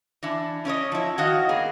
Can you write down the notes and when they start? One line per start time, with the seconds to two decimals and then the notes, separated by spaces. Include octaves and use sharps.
0.23 E3 D4 E4
0.65 C#4 E4 C#5 D#5
0.92 F3 E4
1.18 D#3 F#4 C#5 D#5 F5
1.49 A#3 B3 G#4